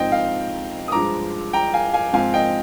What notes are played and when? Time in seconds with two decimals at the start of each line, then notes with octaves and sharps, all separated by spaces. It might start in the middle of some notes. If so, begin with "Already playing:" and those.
Already playing: G#2 F3 C4 D#4 D#5 G5
0.12 F5
0.88 D#6
0.92 G2 F3 G#3 A#5 D6
1.53 G5 A#5
1.74 F5 G#5
1.93 F5 G#5
2.13 G#2 F3 C4 F5 G#5
2.34 D#5 G5